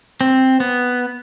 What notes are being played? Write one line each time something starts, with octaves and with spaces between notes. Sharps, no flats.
C4
B3